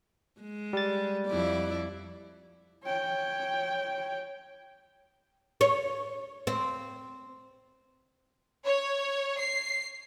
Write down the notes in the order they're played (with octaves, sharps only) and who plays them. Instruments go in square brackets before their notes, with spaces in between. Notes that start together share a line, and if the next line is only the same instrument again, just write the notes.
[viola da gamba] G#3
[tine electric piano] G3 A6
[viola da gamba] F2 E4 D5
[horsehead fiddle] C#5 G5
[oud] C#5
C4
[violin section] C#5
C7